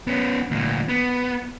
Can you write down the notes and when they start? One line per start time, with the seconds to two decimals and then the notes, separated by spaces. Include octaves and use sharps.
0.07 B3 C#4
0.51 D2 A#2
0.89 B3